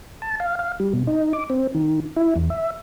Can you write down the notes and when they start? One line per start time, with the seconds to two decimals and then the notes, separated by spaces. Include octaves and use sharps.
0.22 A5
0.40 F5
0.59 F5
0.80 G3
0.93 B2
1.07 D#4
1.33 D6
1.50 C4
1.74 D#3
2.16 E4
2.36 E2
2.50 E5